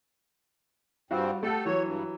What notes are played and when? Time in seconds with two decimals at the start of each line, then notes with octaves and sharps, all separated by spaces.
1.11 G2 G3 C4 F4 F#4
1.43 A3 G4 A4 F#5
1.65 E3 F#3 C#5
1.84 G2